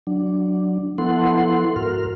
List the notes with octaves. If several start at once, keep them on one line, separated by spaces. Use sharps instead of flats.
F#3 D4
F3 B3 E4 A4 F#5 C6
G#2 F#4 A#4 F6